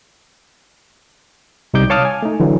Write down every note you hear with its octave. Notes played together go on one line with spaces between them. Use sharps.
C2 C3 G3 D#4 D6 G6
C#5 F5 A5 D6 D#6 F6
G#5
A3 D#4
D3 E3 F#3